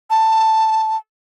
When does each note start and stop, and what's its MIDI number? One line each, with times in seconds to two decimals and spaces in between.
0.10 0.97 81